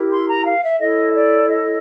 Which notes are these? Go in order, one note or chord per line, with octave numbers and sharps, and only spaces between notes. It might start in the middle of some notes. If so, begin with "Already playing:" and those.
Already playing: E4 G4 A#4
C6
A#5
F5
E5
E4 A4 C#5 D#5
D5
D#5